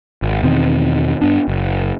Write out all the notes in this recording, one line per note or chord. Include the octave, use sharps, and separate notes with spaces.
G#1
E2 B2 D#3 C4
G2 B3 D4
F#1